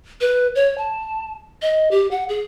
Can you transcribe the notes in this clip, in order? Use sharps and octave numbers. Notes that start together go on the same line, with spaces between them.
B4
C#5
A5
D#5
G4
F#5
G#4